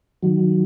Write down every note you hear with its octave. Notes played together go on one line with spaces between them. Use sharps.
D#3 F#3